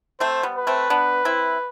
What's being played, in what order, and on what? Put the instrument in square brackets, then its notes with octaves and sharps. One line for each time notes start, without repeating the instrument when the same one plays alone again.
[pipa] A3 C4 [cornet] C5
[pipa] G3 B3
[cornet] B4
[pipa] A3 C4
B3 D4
C4 E4